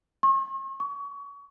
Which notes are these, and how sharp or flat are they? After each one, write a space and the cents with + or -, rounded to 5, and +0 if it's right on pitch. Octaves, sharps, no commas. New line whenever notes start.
C#6 -45
C#6 +30